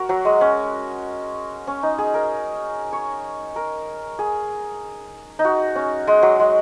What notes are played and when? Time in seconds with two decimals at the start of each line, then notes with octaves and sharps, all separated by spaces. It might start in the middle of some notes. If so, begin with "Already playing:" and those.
Already playing: F#4 A#4
0.09 F#3
0.25 G#3
0.41 C#4
1.67 C#4
1.83 D#4
1.98 G#4
2.14 A#4
2.93 C#5
3.56 A#4
4.19 G#4
5.39 D#4
5.45 F#4
5.75 C#4
6.07 G#3
6.23 F#3
6.40 G#3